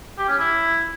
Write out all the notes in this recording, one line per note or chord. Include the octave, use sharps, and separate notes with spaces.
G4
C#4
E4